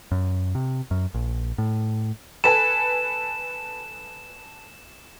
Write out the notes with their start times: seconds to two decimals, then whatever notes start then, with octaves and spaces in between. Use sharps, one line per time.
0.11 F#2
0.55 C3
0.91 F#2
1.14 A#1
1.58 A2
2.44 A4 B4 G#5 E7